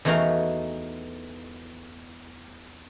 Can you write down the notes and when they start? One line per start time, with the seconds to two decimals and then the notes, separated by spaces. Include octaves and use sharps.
0.05 E2 E3 A3 D#4 F#4 F5